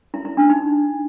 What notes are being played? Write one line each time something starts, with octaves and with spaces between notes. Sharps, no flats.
E4
E4
D4
D#4